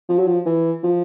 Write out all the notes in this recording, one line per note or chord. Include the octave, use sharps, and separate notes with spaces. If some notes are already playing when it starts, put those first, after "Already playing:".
F3
F#3
F3
E3
F3